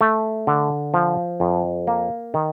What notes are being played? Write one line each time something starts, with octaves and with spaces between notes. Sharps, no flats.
A3
D3
F3
F2
A#3
D#3